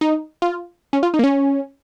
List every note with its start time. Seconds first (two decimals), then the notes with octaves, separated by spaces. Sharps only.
0.01 D#4
0.42 F4
0.93 C#4
1.03 F4
1.14 D#4
1.19 A#3
1.24 C#4